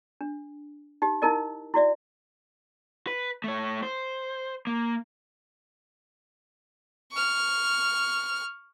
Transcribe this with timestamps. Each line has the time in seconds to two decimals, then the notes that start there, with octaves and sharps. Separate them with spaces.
0.21 D4
1.02 D#4 G4
1.22 D#4 E4 A#4 D#5
1.74 E4 F#4 D5 E5
3.07 B4
3.44 A3 C#5
3.83 C5
4.67 A#3
7.12 C#6 F6